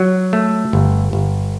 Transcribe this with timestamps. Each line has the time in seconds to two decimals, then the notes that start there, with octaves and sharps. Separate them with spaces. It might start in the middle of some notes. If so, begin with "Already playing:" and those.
Already playing: F#3
0.33 A3
0.73 G1
1.13 G1